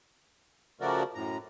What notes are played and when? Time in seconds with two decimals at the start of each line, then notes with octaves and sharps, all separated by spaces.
0.81 C#3 F3 A3 F#4 A#4 D5
1.15 F#2 A2 A#5